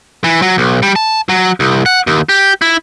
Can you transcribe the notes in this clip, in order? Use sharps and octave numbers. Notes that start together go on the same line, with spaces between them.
E3
F#3
B1
G3
A5
F#3
C2
F#5
D#2
G4
E4